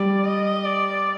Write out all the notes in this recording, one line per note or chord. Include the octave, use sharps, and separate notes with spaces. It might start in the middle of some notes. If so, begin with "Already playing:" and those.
Already playing: G3 D5
D#5
D5